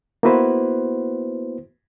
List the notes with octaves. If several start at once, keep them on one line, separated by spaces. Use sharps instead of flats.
A#3 B3 E4 F#4 B4 C5